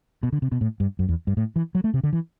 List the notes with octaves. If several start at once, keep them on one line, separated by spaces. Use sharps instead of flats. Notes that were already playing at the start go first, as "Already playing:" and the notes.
B2
D3
C3
B2
A2
G2
F#2
E2
G2
A2
E3
F#3
A3
C3
D3
E3